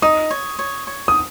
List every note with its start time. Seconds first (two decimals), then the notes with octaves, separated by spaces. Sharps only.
0.02 D#4 D#6
0.31 C#5
0.59 C#5
0.87 C#5
1.08 D#6